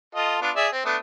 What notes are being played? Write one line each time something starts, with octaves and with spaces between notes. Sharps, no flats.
F4 A4 D#5
B3 D4 F4
G#4 D5 E5
C4
A3 B3 D4